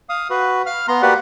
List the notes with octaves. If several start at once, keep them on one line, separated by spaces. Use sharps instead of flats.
F5 D#6
F#4 B4
F5 F6
B3 A#5 C6
A#3 F#4 G4 B4 D5 F#5